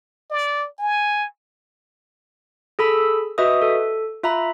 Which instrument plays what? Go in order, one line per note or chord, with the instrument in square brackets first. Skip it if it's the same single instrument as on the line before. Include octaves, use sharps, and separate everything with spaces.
[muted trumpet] D5
G#5
[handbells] G#4 A4 B5 E6
F#4 B4 D#5 E5 D#6
A4
F4 E5 A#5 B5